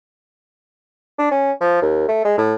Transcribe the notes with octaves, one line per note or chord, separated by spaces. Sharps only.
D4
C#4
F3
D#2
A3
G#3
A2